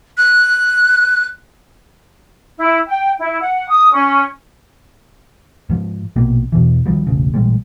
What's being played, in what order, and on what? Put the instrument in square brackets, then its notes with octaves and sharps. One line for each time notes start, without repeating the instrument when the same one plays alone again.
[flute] F#6
[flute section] E4
G5
E4
F#5
D#6
C#4
[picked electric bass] G#2 F3
A#1 B2 A#3 C4
E2 B2 E3
D2 D#3 F3 G3
E1 A1 C#3
A1 A#2 G3 G#3